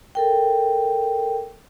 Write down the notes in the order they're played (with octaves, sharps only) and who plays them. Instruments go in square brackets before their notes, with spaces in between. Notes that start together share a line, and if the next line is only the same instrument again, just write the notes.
[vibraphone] A4 A#4 G5